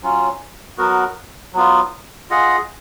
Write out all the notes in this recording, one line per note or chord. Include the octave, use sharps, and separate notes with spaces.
F#3 C#4 F4
F#3 B3 F#4 A#4
F#3 B3 F4
F4 G#4 D#5 F#5